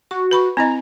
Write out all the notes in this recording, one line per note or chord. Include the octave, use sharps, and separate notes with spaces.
F#4 C#6
B4 B5 C#6
C4 E4 D#5 A#5